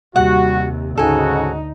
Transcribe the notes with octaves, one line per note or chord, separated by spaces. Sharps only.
D#2 C3 G3 F#4 F#5
D2 G#2 C#3 D#4 F#4 A4 G#5